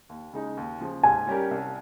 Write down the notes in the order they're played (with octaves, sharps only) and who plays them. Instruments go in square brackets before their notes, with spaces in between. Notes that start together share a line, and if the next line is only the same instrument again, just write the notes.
[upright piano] D#2
C#3 G#3 D#4
D#2
C#3 F3
[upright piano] G#2 [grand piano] G#5
[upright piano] G3 C#4 G4 A#4
C2